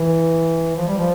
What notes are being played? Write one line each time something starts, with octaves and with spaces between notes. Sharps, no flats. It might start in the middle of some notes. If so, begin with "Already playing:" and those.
Already playing: E3
F3
G3
F3